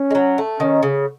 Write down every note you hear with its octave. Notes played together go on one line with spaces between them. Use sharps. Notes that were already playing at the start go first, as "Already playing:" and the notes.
Already playing: C#4
G#3
F#3
A3
D#3 C#4
C#3